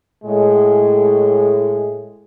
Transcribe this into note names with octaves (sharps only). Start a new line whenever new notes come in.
A2 G#3